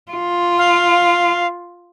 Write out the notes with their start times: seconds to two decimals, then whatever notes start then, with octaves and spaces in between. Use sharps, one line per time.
0.11 F4
0.58 F5